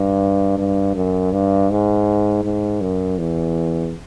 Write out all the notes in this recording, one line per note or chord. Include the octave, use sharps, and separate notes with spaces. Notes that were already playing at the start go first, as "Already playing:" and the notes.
Already playing: G2
G2
F#2
G2
G#2
G#2
F#2
E2